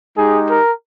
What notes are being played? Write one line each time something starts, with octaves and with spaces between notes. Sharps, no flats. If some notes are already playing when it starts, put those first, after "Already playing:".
G#3 D#4 G4 G#4
A#4